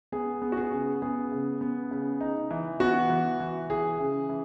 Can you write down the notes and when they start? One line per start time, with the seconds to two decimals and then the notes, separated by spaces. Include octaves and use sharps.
0.12 B3 G#4
0.42 B3
0.52 F#4
0.57 G#4
0.71 C#3
1.02 B3 G#4
1.32 C#3
1.61 B3
1.91 C#3
2.21 D#4
2.51 E3
2.80 B3 F#4
3.10 E3
3.40 E3
3.70 E3 G#4
4.00 C#3
4.29 E3